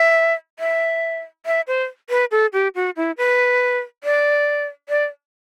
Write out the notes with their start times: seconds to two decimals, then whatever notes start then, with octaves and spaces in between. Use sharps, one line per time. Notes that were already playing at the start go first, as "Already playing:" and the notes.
Already playing: E5
0.59 E5
1.46 E5
1.67 C5
2.10 B4
2.31 A4
2.53 G4
2.75 F#4
2.96 E4
3.17 B4
4.04 D5
4.89 D5